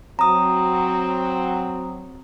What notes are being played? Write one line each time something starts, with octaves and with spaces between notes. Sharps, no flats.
F#3 C4 F#4 A#5 D#6